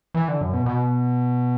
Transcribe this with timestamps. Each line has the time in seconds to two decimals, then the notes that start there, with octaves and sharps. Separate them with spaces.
0.14 E3
0.28 D3
0.41 F#2
0.53 B2
0.66 B2